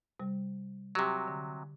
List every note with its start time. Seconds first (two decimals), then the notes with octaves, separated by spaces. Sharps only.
0.20 C3 G3
0.95 C3 F#3 G4
1.28 D3